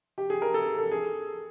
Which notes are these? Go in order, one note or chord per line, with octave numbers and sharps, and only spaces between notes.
G4
G#4
A#4
A4
A4
G#4